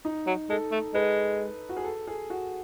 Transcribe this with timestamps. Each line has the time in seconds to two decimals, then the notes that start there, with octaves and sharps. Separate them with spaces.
0.05 D#4
0.27 F#3
0.50 G#3 A4
0.72 A3
0.94 G#3 B4
1.69 F#4
1.77 G#4
1.84 A4
2.07 G#4
2.30 F#4